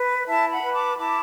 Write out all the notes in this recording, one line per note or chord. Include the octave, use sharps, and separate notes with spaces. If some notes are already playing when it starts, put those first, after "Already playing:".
Already playing: B4
E4 E5 A5
F#5 B5
B4
A5 D6
E4 A5 D6